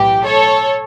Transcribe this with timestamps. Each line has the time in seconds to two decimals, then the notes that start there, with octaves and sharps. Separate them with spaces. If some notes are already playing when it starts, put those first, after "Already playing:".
Already playing: B1 A2 E3 G4
0.25 A4 C#5